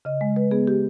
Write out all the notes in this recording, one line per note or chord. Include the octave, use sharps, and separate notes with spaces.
C#3 D#5
G#3
G#3 B4
B3 G#4
G4